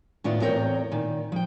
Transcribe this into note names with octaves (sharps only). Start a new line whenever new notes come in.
A2 D#3 B3 D4 F4
E2 A2 C4 A#4 C#5 G5
A#2 D#3
F3 G5